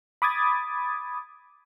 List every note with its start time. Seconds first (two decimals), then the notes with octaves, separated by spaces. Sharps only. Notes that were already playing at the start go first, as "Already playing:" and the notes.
0.22 B5 D6 D#6 G#6 A6